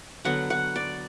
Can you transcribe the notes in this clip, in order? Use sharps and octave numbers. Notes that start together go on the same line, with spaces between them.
D3 F#3 B3 F#5
F#5
D5